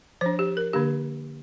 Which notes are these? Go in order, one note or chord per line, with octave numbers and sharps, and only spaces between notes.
F3 D4 C5
G4
A#4
D3 A#3 D4 G4